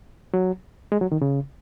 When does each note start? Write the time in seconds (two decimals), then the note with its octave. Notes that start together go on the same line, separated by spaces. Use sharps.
0.34 F#3
0.92 G#3
1.01 F#3
1.12 D#3
1.21 C#3